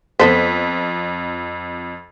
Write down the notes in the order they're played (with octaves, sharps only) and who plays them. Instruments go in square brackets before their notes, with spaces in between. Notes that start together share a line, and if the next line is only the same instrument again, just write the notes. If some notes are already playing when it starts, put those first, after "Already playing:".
[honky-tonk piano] F2 B6 [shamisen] B3 A4 C5